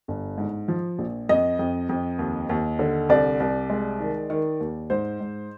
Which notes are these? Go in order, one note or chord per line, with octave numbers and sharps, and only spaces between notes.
G1
G#2
F3
A#1
F2 D#5
F2
F2
D#2
D#2
D3
C2 D5
C2
G#3
D#3
D#3
D#2
G#2 C5
G#2